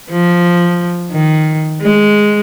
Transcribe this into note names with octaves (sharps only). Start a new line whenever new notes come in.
F3
D#3
G#3